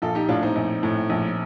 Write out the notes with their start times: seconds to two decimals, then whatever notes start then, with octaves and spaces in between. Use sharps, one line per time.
0.02 A#1 F4 A4
0.15 D#4 G4
0.29 A2 D4 F4
0.42 C4 D#4
0.56 A#1
0.83 A2
1.09 A#1